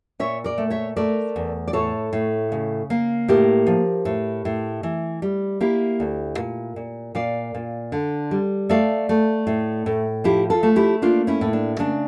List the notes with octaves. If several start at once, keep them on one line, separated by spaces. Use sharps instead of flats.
A#2 C#5 E5
A#4 D5
A3
C#5 E5
A3 A#4 D5
E2
D5
A2 A4 C#5
A2
C#3
A#3
A2 G4 A#4
F3
A2
A2
E3
G3
A#3 E4 G4
D2
A#2
A#2
A#2 D5 F5
A#2
D3
G3
A3 D5 F5
A3
A2
A2
F3 E4 G4
F4 A4
A3
E4 G4
A#3 D4 F4
C#4 E4
A2
D4
C#3 D4